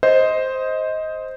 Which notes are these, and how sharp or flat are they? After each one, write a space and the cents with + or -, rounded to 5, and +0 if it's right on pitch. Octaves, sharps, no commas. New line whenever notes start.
C5 +0 D#5 +15